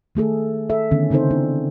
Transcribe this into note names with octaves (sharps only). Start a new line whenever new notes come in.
D#3 A3 G#4 A4
A4 E5
D3 D#3 B3 C#4
C#3 C4 D#4 A4 C5
B3 D4 E4